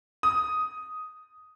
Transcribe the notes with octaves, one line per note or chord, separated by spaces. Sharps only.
D#6